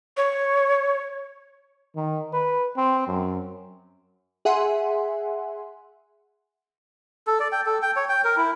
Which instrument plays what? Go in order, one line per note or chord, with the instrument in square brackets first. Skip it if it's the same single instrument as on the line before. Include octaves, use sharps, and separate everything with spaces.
[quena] C#5
[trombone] D#3
B4
C4
F#2
[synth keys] G#4 E5 F#5 G#5 C6
[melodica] A4
D5
G5
A4
G5
C#5
G5
A#4
E4